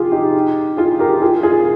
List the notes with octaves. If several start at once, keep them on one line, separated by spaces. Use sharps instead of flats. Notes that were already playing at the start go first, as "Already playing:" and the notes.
Already playing: F4 G4 G#4
D#4 G4
F4 G#4
G4 A#4
F4 G#4
F4 G#4